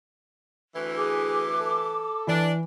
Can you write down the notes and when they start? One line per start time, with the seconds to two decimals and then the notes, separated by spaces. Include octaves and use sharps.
0.74 D2 E3
0.98 G#4 D6
1.60 A4
2.27 E3 D4